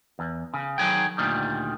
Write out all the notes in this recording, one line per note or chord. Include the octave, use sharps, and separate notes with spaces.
E2
C#3
D#3 F#3 G#4 G5
D2 A#2 D#3 G3